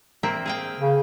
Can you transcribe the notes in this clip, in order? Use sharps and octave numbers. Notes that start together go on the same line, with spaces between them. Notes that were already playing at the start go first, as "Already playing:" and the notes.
A#3 C4 E5
G#4 F5 G5
C#3